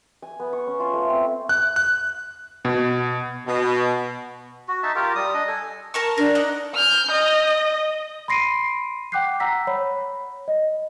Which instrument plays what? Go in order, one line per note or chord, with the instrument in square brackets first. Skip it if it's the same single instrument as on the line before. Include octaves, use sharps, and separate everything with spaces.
[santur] G#5
B3
C#6
C#4
F4
A3
C4
[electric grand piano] F#6
F#6
B2
[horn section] B2
[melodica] F#4
D#4 E5 A5
F4 G4 A#4
G3 D#6
D4 D#5
A4 G#5
[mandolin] A#4 A5 C#6
[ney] D4 [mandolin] A#4
[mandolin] D#4 F#5
[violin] F6 G6
D#5
[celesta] B5 C6 A#6 C7 D7 D#7
F#5 G5 D6 F#6 G6 C7
F#5 A#5 E6 A#6 B6
C#5 B5
D#5